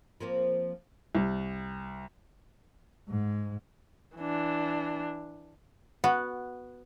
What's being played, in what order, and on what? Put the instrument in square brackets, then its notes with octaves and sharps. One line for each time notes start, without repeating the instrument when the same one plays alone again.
[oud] F3 A#3 C4
[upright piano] C2
[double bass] G#2
[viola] E3 D4
[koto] B3 F#4